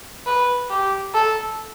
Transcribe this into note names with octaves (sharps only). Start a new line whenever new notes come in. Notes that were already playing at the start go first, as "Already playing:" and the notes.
B4
G4
A4